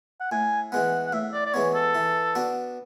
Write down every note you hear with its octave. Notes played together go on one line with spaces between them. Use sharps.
F#5
A2 G#5
E3 G#3 B3 F#5
F#5
A2 E5
D5
D5
E3 G#3 B3 C#5
A4
E3
B3 D4 F#4